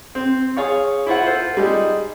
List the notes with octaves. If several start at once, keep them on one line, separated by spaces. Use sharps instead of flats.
C4
G#4 C#5 F5 C#6
E4 F4 C5 F#5
F4 A4 C5
G3 G#3 D#4